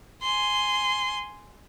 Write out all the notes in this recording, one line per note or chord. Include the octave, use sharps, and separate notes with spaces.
G#5 C6